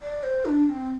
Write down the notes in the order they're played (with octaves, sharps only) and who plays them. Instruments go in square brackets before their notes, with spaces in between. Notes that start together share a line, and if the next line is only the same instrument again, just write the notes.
[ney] D5
C5
D#4
D4
D4
C4